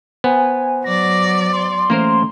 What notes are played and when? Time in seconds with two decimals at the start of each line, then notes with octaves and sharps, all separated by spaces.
0.24 B3 C5 G#5
0.84 F#3 D5 A#6
1.53 C6
1.90 E3 A3 A#3 C#4 A#4 C5